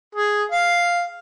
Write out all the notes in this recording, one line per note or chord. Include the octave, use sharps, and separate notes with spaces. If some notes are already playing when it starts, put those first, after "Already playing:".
G#4
F5